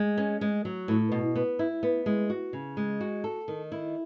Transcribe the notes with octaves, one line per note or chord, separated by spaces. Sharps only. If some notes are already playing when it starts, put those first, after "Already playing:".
Already playing: G#3
C#4
G#3
F#3
A2
B2
B3
E4
B3
G#3
F#4
C#3
G#3
F#4
A4
D#3
E4